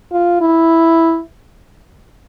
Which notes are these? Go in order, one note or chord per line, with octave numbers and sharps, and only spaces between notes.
F4
E4